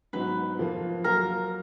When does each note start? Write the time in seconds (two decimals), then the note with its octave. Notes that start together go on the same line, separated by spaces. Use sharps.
0.13 G#2 F#3 B3 D#4 B4
0.59 F2 F3 A#3 F4
1.04 F#3 A#3 F4 A#4